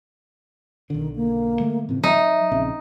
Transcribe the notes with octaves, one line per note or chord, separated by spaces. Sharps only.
B1 D3 D#3
A#3
D3 G#3 A3
A2 C#3 E3 C4
F#3 D#4 E5
A#1 C#3 C4